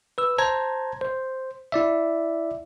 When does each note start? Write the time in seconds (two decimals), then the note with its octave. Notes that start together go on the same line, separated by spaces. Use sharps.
0.18 B4 E6
0.38 C5 A5 A#5 G#6
1.01 C5
1.72 E4 D5 E5